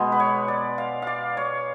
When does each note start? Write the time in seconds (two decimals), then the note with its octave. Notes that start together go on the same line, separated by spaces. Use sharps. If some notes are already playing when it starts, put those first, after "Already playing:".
Already playing: B2 G#3 B3
0.12 B4
0.20 C#5
0.48 D5
0.78 F5
1.02 D5 F5
1.37 C#5